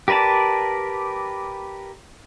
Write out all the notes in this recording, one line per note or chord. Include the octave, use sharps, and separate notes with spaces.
G4 A#4 B4 D5 A5